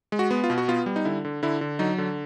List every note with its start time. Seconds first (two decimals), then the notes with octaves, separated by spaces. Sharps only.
0.12 G#3
0.19 F#4
0.31 B3
0.44 F4
0.50 B2
0.58 F#4
0.68 B3 F4
0.86 G3
0.96 D#4
1.05 D3 E4
1.25 D3
1.43 D3 E4
1.61 D3
1.79 F#3 D#4
1.98 D3